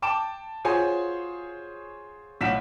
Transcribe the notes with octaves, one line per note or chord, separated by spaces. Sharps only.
G5 A5 D6 D7 E7
F4 F#4 G#4 C5 C#5 G#5
B1 A2 F#5 B6 E7